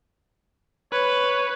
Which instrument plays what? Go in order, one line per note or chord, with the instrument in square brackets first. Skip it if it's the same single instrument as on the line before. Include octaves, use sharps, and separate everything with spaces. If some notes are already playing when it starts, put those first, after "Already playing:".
[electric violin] B4 [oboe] C#5